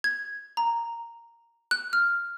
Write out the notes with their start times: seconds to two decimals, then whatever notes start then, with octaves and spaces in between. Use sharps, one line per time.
0.04 G#6
0.57 A#5
1.71 F#6
1.93 F6